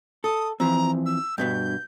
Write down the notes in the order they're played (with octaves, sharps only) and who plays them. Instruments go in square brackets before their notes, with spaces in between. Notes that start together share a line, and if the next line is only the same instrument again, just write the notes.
[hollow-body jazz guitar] A4 [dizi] D#6
[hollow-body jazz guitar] E3 F3 C4 [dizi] A#5
[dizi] E6
[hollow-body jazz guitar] G2 B2 B3 [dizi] G6